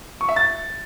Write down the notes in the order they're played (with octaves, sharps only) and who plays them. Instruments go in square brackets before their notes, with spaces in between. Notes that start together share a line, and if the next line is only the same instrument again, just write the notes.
[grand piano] C#6
E5
A6